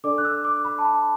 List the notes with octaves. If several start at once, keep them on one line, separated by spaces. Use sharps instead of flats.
D4 A4 D5 D6
F#6
E6
D6
B5
A5
B5